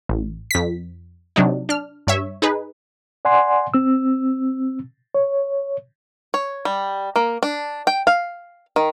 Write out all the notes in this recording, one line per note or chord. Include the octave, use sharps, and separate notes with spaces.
A1
F2 B6
C3 F#3 D4 D#4
D4 F6
G2 C#5 E5
D#4 G#4 B4
D5 F#5 G#5 C6
C4 E6
C#5
C#5
G3
A#3
D4
G5
F5
D#3